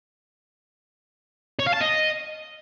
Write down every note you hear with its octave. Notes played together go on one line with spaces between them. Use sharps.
C#5
F5
A5
D#5